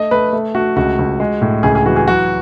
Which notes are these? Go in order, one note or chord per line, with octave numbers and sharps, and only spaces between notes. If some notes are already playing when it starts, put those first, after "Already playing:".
Already playing: A3 D#5
A3 B4
A3
A3 F#4
C#2 F#4
C#2
G#3
A2
C#2 G#4
G#4
E3 F#4
G#4
F#3 F#4